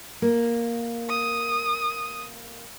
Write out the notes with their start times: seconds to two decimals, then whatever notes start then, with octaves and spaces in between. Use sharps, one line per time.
0.22 A#3
1.10 D#6